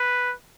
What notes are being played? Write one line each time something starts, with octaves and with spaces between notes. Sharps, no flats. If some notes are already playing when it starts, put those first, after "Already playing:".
Already playing: B4